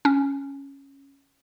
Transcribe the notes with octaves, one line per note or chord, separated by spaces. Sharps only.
C#4